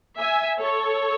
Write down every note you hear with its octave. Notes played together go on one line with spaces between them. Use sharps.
E5 G#5
A4 C#5